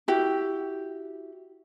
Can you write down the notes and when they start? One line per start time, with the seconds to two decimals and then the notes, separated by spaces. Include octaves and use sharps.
0.08 E4 F#4 G4